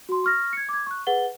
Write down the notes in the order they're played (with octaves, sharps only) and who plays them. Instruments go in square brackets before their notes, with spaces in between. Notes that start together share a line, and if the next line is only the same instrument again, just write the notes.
[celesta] F#4 C6
C#6 F6 A#6
G#6 C#7
D6 G#6
C#6 F#6
G#4 B4 F#5 A6 G7